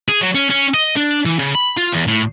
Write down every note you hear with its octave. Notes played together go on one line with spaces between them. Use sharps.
G#4
F#3
C#4
C#4
D#5
D4
E3
C#3
B5
F4
E2
A2